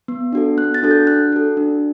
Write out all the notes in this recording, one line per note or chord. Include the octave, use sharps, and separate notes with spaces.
B3
D4 F#4 A4
B3 F#6
A6
D4 F#4 A4
G6
D4 F#6
F#4 A4
D4